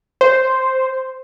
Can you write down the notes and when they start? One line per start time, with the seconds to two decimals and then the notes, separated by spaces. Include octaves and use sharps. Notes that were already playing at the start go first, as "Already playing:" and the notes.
0.21 C5